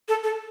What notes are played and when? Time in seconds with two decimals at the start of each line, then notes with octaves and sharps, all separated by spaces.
0.08 A4
0.23 A4